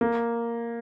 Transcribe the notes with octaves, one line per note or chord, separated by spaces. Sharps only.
A#3